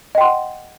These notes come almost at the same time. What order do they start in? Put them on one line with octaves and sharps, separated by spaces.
D#5 G5 C6 F#5